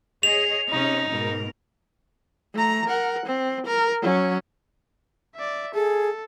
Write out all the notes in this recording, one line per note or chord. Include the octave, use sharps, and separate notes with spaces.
G#4 C#5 D#5 F7
C3 C#4 D#4 D#5
G#2 B2 A#4
A3 A#5
A#4 F#5
C4
A#4
F#3 C#4
D5 E5
G#4 A4